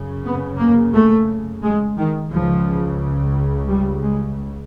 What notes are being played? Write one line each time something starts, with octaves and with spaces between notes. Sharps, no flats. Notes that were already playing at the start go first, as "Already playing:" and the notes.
Already playing: F#2 C#3
B3
A#3
A3
G#3
D#3
C#2 C#3 F3
G3
G#3